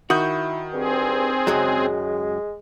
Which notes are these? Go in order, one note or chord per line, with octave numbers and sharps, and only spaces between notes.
D#3 E4 F#4 D#6 G6
G2 C4 G#4
C#2 F#2 F#3 G#3